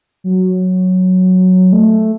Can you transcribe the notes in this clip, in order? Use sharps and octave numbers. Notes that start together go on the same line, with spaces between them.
F#3
A3